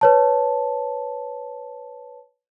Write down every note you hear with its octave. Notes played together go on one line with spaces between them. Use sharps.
B4 C#5 A5